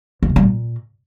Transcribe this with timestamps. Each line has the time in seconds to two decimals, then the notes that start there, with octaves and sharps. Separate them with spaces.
0.23 E2
0.29 C3
0.36 G3
0.43 A#2